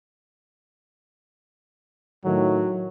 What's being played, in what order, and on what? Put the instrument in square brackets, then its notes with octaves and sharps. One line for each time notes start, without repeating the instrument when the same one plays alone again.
[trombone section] A2 D#3 [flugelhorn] F#3